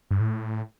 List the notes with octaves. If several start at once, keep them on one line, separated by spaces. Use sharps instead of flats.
G2
A2